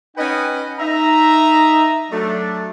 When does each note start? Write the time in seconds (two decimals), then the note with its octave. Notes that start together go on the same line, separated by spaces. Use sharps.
0.17 C#4 D#4 B4 D#5 F#5 G5
0.79 D#4 E5 A#5
2.11 F#3 A3 D4